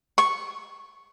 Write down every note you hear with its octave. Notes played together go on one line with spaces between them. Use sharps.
C#6